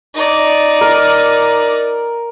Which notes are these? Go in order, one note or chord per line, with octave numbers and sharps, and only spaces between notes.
D#4 D5
A#4